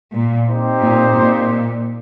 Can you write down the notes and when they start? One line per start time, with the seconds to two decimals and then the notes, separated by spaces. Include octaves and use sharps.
0.14 A#2
0.48 C4 D#4 G4 C5
0.82 A#2
1.16 A#2